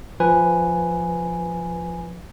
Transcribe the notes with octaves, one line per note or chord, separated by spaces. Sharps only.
F3 B4 G#5